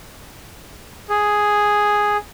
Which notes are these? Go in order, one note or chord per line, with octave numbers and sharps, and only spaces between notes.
G#4